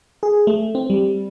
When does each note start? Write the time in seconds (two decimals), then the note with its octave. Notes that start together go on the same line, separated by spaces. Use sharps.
0.23 G#4
0.47 A3
0.75 C4
0.90 G3